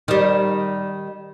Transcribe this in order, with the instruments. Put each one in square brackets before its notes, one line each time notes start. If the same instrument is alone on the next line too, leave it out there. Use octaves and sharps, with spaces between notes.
[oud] D#3 G3